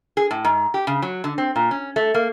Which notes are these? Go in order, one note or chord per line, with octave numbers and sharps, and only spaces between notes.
G#4
A2
G#2
G4
C#3
F#3
D3
C4
A#2
C#4
A3
A#3